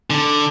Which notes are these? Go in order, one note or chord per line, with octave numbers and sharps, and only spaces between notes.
D3